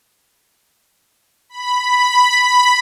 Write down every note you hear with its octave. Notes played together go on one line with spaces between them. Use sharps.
B5
B5
B5